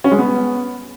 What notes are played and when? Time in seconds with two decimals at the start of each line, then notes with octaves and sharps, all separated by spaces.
0.04 C#4
0.11 G#3
0.19 B3